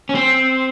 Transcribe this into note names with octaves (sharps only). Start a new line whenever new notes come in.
C#4
C4